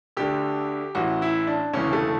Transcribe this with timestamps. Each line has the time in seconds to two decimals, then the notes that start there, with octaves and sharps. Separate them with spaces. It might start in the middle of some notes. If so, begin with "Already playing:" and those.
0.17 D2 D3 G4
0.95 A1 A2 E3 F#4
1.22 E4
1.47 D4
1.73 E1 D2 C#3 E3 C#4
1.93 A3